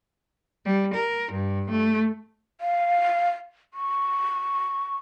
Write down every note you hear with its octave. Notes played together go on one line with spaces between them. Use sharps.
G3
A#4
G2
A3
F5
C#6